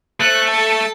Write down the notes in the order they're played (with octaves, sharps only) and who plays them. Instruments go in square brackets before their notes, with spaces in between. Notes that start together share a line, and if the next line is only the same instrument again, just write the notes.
[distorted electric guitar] A3 [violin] C5 F#6
[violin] A4 A5